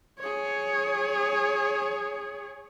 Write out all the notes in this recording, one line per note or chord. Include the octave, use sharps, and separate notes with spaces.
G#4 C#5